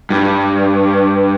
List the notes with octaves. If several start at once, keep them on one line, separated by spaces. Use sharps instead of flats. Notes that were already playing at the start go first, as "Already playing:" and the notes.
G2